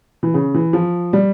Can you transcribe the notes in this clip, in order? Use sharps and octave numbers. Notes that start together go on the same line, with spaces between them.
E3
C#3
E3
F3
G3